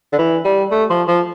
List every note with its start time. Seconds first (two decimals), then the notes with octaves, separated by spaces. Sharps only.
0.12 D3
0.18 E3
0.45 G3
0.72 A3
0.90 F3
1.08 F3